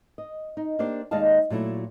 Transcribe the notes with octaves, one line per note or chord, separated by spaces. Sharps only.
D#5
D#4
A#3 D4 G4 C5 D5
D#2 G#3 D5 D#5 F5 A5
A#2 F#3 A3 E4